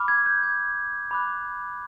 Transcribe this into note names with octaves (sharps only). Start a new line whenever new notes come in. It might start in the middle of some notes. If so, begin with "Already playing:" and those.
Already playing: B5 D6 F6
G#6
G6
G#6
B5 D6 F#6